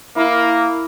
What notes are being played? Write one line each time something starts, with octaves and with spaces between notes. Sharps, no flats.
A#3 E4